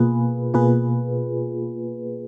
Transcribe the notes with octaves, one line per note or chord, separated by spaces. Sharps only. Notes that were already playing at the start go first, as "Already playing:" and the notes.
Already playing: B2 A#3 F4 G#4 B4
B2 A#3 F4 G#4 B4